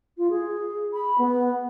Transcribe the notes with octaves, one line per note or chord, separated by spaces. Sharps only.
F4
G#4
B5
B3